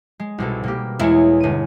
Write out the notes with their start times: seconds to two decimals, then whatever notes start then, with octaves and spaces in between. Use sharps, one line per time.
0.20 G#3
0.38 C2 B2 A4
0.64 B2 A#3 G4
1.00 E2 G#3 E4 C#5
1.40 G1 D#7